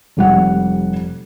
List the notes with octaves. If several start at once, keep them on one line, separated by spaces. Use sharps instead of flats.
F1 G3 F#5